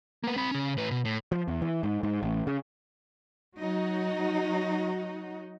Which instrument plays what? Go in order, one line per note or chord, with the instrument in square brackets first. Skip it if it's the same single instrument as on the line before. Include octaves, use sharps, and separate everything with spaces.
[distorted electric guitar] A#3 B3
C4 B5
C#3 C#4
A2 B4
B2
A2
[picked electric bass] F3
E2
E3
G#2
G#2
A1
C#3
[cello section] F#3 D#4 F#4